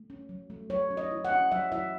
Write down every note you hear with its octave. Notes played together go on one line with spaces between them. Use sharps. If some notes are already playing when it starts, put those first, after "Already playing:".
Already playing: A3
C#4
F#3
A3
F#3 C#5
C#4
D#5
E4
F#5
C#4
F#3 E5
E4 E5